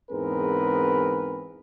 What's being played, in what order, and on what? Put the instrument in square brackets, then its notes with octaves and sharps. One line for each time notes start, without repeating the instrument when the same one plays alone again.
[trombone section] E2 G#2 C4 G#4 A#4 B4